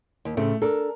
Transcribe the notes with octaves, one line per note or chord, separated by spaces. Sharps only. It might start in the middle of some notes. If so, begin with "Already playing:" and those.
D#2
A2 C#3 A3 C4
D4 A4 A#4